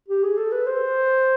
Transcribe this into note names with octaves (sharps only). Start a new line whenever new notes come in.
G4
G#4
A4
B4
C5